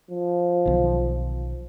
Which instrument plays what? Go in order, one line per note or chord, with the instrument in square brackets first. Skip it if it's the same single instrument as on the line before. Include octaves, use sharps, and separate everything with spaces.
[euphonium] F3
[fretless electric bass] B1 D3 D#3